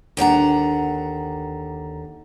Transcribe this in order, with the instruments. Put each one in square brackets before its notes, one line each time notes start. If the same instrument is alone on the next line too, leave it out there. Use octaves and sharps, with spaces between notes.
[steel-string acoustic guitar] D#2 D3 F#5 A#5